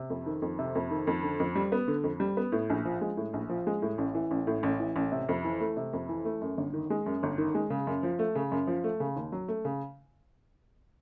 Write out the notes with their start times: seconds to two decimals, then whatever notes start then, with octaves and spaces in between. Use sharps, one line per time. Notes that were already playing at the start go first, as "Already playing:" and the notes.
Already playing: C3
0.10 F2
0.26 D#3
0.42 F2
0.59 C3
0.75 F2
0.91 D#3
1.07 F2
1.23 D3
1.40 F2
1.56 G3
1.72 B3
1.88 D3
2.04 F2
2.20 G3
2.37 B3
2.52 A2
2.70 A#1
2.85 F3
3.01 G#3
3.17 A2
3.33 A#1
3.49 F3
3.67 G#3
3.82 A2
3.98 A1
4.15 E3
4.31 A1
4.47 A2
4.63 A1
4.80 E3
4.96 A1
5.12 C3
5.29 F2
5.44 E3
5.60 A3
5.77 C3
5.93 F2
6.09 E3
6.25 A3
6.41 F#2
6.57 G1
6.73 D#3
6.90 G#3
7.06 F#2
7.23 G1
7.38 D#3
7.55 G#3
7.70 C#3
7.87 F#2
8.03 F3
8.19 A3
8.35 C#3
8.52 F#2
8.67 F3
8.84 A3
9.00 C#3
9.16 D#2
9.32 F#3
9.48 A3
9.65 C#3